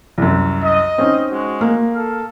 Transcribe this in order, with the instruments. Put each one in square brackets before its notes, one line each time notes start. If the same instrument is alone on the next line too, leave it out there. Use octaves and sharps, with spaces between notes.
[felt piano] C2 F#2
[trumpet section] D#5
[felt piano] C4 C#4 D#4
[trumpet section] G#3 F#4
[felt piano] A#3
[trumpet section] A4 F5